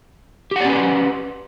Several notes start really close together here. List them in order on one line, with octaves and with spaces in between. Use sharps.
G4 F#5 D5 C#4 B4